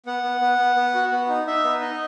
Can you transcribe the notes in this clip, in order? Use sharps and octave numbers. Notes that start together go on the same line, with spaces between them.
B3 F#5
B3
B3
B3
B3
F#4
B3
D#4
D#4 E5
B3
D#4 D#5